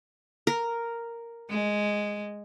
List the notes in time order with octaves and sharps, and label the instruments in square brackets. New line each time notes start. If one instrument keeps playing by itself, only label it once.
[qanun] A#4
[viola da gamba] G#3